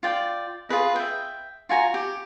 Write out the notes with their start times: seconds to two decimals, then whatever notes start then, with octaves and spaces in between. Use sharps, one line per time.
0.03 F4 D5 G5
0.69 F4 G#4 B4 D#5
0.96 E5 G5
1.69 F4 F#4 G#5 A#5
1.94 G4